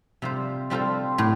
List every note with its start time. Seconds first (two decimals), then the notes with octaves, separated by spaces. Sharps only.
0.22 C3 G3 F4 C5
0.70 G3 C4 F4 A4 C5
1.18 A2